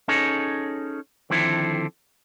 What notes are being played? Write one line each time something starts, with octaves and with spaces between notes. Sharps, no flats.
C#4 D#4 G#4 A4 C#5
D3 D#3 F3 C4 E4 A4